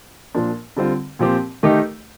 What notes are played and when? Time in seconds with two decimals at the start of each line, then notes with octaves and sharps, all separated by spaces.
0.35 A#2 F3 A#3 D4
0.77 D3 G3 C4 F4
1.19 A#2 F3 C4 G4
1.63 D#3 A3 D#4 G4